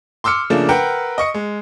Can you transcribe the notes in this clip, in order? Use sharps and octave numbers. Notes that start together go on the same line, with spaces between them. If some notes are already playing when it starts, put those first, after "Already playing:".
C6 D6 E6 F6 C#7
C#3 F3 A3 A#3 D4
A#4 B4 F#5 G5
D#5 C#6 C#7
G#3